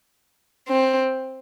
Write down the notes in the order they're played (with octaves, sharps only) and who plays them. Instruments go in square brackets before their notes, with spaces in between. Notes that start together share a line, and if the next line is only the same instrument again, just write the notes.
[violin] C4